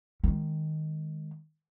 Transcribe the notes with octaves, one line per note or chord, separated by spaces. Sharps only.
D#3 G#3